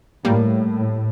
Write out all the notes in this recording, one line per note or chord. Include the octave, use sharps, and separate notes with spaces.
A2 G3 A#3